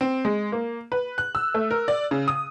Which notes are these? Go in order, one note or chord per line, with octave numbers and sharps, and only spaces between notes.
C4
G#3
A#3
B4
F#6
E6
A3
A#4
D5
C#3
D#6